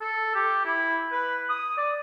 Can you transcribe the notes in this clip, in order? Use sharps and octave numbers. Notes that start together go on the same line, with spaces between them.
A4
G4
E4
B4
D#6
D5